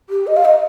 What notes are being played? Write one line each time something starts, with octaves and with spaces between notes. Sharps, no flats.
G4
D#5
F5
D#5